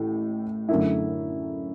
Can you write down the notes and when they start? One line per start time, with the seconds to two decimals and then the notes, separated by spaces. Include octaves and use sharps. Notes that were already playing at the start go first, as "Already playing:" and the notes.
Already playing: A1 A2 A3
0.69 F#2 D3 A3 E4